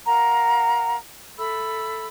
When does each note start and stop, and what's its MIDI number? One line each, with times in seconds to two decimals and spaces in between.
0.05 0.95 70
0.05 0.95 77
0.05 0.95 78
0.05 0.95 82
1.38 2.07 69
1.38 2.07 76
1.38 2.07 83
1.38 2.07 88